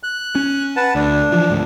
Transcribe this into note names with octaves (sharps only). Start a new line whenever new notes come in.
F#6
C#4
B4 F#5 A5
D2 D4
E3 F3
D2 G#2